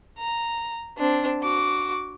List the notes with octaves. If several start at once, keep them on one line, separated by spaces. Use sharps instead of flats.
A#5
C4 D4
F#4 D6